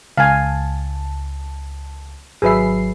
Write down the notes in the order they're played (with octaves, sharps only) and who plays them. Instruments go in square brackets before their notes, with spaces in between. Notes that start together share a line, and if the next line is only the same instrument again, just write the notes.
[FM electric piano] C#2 A5 [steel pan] F5 G#5
[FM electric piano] G#1 F#3 C7 [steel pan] G#4 B4 E5